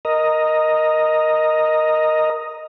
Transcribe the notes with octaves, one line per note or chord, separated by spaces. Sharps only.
A#4 D#5